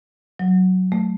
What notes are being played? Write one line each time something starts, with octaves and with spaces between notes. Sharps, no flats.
F#3
A3